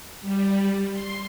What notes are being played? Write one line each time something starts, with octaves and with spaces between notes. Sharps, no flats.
G3
C6